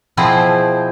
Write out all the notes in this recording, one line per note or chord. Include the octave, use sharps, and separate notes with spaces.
B2 F3 C4 E4 G#4 C5